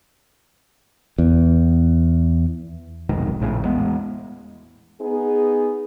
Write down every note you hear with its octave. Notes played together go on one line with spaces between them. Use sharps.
E2
F1 B1 G#2 D#3
A#1 A2 C#3
E2 G#3 B3
B3 D#4 G#4